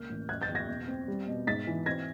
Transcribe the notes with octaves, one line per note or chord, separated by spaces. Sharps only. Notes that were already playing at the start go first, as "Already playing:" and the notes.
Already playing: C#2 A#3 F6 G6
A1
F#1 F#6 G#6
G6 A6
E2
G#6 A#6
B2
C4
G3
B2
G#2 A6 B6
E3
C4 G#6 A#6